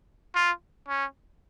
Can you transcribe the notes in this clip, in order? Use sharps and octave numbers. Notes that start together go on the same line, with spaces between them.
F4
C#4